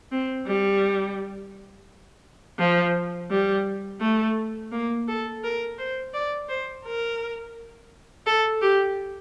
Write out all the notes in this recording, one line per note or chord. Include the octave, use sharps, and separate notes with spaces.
C4
G3
F3
G3
A3
A#3
A4
A#4
C5
D5
C5
A#4
A4
G4